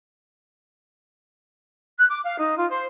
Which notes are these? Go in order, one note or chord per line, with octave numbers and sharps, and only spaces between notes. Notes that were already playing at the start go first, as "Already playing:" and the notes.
F#6
D6
F5
D#4
F4
C5